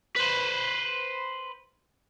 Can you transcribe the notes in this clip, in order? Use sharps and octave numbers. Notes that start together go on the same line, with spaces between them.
B4 C5